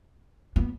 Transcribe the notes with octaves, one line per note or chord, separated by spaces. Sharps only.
B3